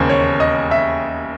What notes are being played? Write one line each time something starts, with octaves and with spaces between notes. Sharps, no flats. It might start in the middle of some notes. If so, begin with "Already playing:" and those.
Already playing: E1 D#2 C#3 C5
C#5
D#5
E5